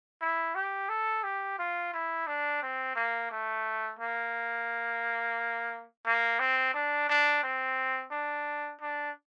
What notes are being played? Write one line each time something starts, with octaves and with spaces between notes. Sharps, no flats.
E4
G4
A4
G4
F4
E4
D4
C4
A#3
A3
A#3
A#3
C4
D4
D4
C4
D4
D4